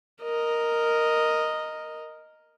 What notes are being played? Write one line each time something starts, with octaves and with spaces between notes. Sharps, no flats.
A#4 D#5